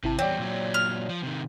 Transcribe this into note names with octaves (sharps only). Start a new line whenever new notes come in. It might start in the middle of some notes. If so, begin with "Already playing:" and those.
G#1 C3 E4 A5
E2 G3 C4 C#5 D5
A#2 F#3
F6
F3
C3 D#3